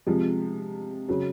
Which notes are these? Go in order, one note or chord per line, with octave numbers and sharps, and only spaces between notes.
C3 F3 G#3
C#3 F#3